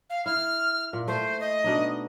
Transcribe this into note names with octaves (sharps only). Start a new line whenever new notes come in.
F5
E4 F6
A#2
A3 C5
D#5
B2 D4 D#4